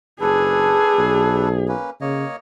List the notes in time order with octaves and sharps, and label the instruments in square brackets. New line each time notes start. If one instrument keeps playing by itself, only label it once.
[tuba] F#1 [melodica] D4 A4 B4 [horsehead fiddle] G#4
[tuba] B1
[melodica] A#3 C#4 B4
[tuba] C#3 [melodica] A#3 C#5 D#5